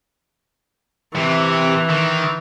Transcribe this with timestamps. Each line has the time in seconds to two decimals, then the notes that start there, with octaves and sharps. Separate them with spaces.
1.15 C3 E3
1.90 D#3